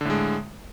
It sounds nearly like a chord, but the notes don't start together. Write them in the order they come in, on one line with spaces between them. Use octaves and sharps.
D3 A2 G#3